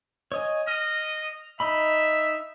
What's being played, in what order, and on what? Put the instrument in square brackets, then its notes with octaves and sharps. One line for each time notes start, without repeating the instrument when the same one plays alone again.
[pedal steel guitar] C#5 D#5 G#5
[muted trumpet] D#5 [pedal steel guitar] F6
[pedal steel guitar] D#4 D#5 B5 [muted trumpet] E5